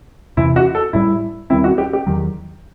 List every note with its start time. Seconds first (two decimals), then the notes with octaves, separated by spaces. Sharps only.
0.37 E2 C3 E3 E4
0.56 F#4
0.75 A4
0.93 A1 A2 G3 E4
1.50 D#2 D#3 G3 C4 E4
1.64 F#4
1.78 G4
1.93 G4
2.06 E2 D#3 F#3